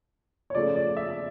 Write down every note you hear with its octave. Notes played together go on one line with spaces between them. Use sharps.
C#5
C#3 F3 A3 D5
D5
E5